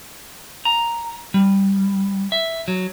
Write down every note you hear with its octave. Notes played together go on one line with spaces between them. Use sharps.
A#5
G3
E5
F#3